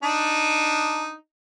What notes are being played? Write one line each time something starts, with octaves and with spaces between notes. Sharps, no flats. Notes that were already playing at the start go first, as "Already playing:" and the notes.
D4 D#4